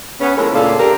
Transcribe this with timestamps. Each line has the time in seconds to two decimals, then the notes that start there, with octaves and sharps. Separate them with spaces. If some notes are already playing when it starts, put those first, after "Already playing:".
0.21 B3 C#4
0.37 F3 G#3 A3 E4 A#4
0.53 D2 A#2 C#3 A4 D5 F5
0.79 G2 D3 G4 A#4